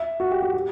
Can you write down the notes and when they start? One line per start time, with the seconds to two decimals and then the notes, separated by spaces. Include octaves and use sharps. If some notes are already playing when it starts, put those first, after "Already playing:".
Already playing: E5
0.20 F#4
0.32 G4
0.42 G4
0.54 G4